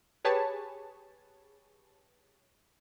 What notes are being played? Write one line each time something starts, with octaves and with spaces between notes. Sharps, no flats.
G4 G#4 B4 C#5 A5